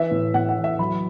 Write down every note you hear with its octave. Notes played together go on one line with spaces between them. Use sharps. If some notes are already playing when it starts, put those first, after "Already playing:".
Already playing: E3 E5
A2
A2 F#5
F#5
E3
E5
F#3 B5